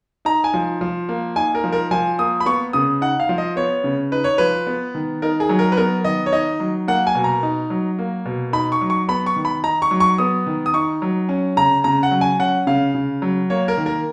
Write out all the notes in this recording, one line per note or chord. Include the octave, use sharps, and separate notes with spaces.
D#4 A#5
G#5
F3
F3
A#3
D#4 G#5
A#4
F3
A#4
F3 G#5
A#3 D#6
B5
B3 C#6
C#3 D#6
D#4 F#5
F5
F3
D#5
B3 C#5
C#3
D#4 B4
C#5
F3 B4
B3
D#3
D#4 A#4
G#4
F#3
A#4
B4
B3 A#4
D#3 D#5
C#5
D#4 D#5
F#3
A#3 F#5
G#5
B2
A#5
D#4
F#3
A#3
B2
D#4 B5
C#6
F#3
C#6
B3 B5
C#6
D#3
B5
D#4 A#5
C#6
F#3
C#6
B3 D#6
D#3
D#6
D#4 C#6
F#3
C#4
C#3 A#5
C#3 A#5
F#5
F#3
G#5
C#4 F#5
C#3 F5
C#3
F#3
A#3 C#5
A#4
D#3
A#4